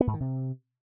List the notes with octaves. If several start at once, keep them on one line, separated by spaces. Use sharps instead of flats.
B3
G#2
D#3
C3